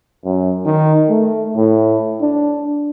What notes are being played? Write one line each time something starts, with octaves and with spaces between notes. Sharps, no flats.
F#2
D#3
A3
A2
D4